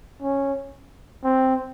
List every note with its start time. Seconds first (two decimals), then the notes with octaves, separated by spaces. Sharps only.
0.22 C#4
1.24 C4